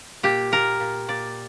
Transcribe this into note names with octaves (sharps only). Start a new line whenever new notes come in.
A#2 G4
A#2 A#4
A#2
A#2 D5